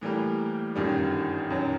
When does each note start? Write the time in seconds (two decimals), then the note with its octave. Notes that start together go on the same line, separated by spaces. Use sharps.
0.01 A2 E3 G3 A#3
0.75 G1 F#2 D#3 G3
1.50 F#2 D#3 F#3